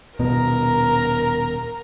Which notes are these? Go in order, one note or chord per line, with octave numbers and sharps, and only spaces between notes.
D#1 B2 B3 A#4 A#5